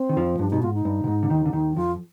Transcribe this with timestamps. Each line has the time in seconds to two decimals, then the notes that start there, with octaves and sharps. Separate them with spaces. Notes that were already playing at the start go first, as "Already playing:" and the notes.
Already playing: C4
0.09 D#3
0.17 F2 F3
0.39 G2 D4
0.51 B2 D#4
0.62 G#2 F4
0.74 D#4
0.85 G2
1.04 B2
1.08 G#2
1.23 D3
1.30 D#2 D#3
1.46 D3
1.53 D#2 D#3
1.76 F2 F3 F4